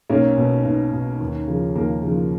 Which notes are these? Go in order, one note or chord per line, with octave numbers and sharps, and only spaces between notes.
B1 A#3 C#4
B2
B1
B2
D#2
C#3 F3
D#2 A#3
C#3 F3